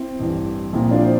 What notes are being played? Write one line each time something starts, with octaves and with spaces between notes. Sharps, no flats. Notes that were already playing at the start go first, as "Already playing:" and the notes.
Already playing: C4 E4
A1 G2 E3
A#1 A#2 F3 C4 E4
D4 F4
C5